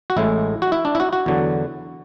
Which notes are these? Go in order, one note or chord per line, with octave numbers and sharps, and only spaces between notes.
F#4
A1 A2 G#3 E4
F#4
E4
D4
E4
F#4
F#4
E2 D3 F#3